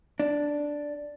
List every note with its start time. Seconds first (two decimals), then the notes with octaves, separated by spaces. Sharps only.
0.20 D4